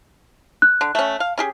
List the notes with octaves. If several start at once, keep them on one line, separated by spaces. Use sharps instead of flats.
F#6
D3
A3 C#4
F5
C#4 G4 G#4